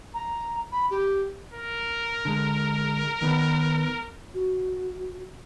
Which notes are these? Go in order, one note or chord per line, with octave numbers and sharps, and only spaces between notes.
A#5
B5
G4
A#4
D3 G#3
D#3 B3 B4
F#4